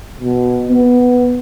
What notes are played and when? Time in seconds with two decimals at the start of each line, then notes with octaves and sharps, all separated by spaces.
0.20 B2
0.69 B3